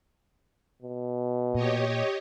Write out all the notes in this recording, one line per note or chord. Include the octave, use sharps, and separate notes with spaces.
B2
A#2 G4 C#5 D#5